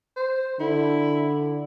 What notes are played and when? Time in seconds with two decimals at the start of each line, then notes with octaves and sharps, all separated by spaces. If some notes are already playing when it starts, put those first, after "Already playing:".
0.16 C5
0.60 D3 E4